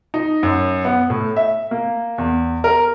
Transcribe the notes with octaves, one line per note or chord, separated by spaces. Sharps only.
D#4
F#2
B3
A2
E5
A#3
E2
A#4